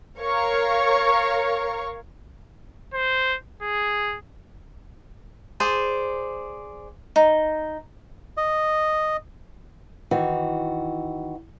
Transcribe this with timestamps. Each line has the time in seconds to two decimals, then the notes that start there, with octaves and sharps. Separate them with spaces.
0.19 A#4 C#5 F5 C#6
2.93 C5
3.62 G#4
5.60 G#4 C5 D5
7.16 D#4
8.37 D#5
10.11 D#3 E3 F#4